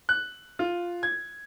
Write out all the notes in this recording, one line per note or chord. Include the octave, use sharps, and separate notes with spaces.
F#6
F4
G#6